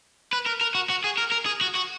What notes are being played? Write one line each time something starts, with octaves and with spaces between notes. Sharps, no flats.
B4
A#4
A#4
F#4
F#4
G#4
A#4
A#4
G#4
F#4
F#4